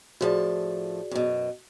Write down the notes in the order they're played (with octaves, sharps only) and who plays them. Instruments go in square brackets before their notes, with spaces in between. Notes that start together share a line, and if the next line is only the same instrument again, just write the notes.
[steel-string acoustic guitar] A2 F3 A5 [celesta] F#4 G#4 D5
[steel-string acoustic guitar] F#2 B2